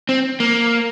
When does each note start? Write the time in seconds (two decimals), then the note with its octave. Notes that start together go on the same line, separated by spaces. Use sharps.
0.09 C4
0.40 A#3